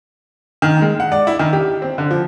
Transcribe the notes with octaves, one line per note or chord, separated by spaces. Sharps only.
D#3
G#3
F#5
D5
E4
D#3
G4
C4
D3
F3